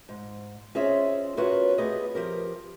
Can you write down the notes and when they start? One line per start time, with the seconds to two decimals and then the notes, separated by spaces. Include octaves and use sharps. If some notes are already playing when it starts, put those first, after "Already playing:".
0.09 G#2
0.75 C#4 F4 G#4 C5 D#5 E5
1.37 B3 F4 F#4 A#4 B4 C#5
1.78 A3 B3 G4 G#4 D#5
2.15 F3 G4 A#4